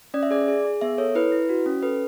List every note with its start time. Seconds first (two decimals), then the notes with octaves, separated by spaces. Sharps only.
0.14 C#4 D5
0.23 E5
0.31 G#4 D5
0.48 G#4
0.65 G#4
0.81 B3 E5
0.98 A4 C#5
1.15 E4 B4
1.32 E4
1.49 F#4
1.66 C#4
1.82 A4 B4